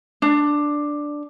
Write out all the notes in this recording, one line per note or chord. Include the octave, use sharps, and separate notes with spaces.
D4